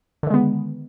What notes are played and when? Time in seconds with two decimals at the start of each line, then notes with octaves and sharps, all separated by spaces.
0.23 D3
0.27 D#3
0.30 G#3
0.34 B3